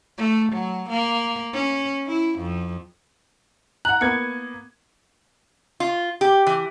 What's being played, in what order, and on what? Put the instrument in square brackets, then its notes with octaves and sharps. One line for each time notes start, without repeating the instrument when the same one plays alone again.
[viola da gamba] A3
F#3
A#3
C#4
E4
F2
[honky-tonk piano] F#5 A#5 [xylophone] F#6 F#7
[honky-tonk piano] A#3 B3 G#6 [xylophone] C#7
[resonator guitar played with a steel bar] F4
G4
E3